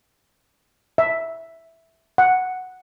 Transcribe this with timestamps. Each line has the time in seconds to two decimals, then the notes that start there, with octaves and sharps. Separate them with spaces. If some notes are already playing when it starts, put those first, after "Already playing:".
0.98 E5
2.18 F#5